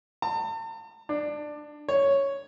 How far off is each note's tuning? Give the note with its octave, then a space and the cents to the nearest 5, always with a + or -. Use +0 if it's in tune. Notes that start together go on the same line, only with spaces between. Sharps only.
A5 +45
D4 +15
C#5 +0